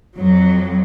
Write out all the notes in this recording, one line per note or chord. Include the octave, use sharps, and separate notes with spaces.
F2 F#3